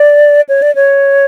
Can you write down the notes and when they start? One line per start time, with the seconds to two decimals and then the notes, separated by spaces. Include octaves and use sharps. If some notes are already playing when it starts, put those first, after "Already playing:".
Already playing: D5
0.49 C#5
0.62 D5
0.75 C#5